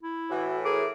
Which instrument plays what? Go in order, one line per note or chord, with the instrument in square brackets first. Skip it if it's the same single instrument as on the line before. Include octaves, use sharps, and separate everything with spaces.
[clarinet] E4
[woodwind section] A2 E3 [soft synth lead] F#4
[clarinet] G#4 [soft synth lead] A#4 [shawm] D6